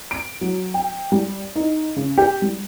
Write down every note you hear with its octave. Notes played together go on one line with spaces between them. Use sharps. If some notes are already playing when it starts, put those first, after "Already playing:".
D7
F#3
G5
G3
D#4
C#3
G4
G3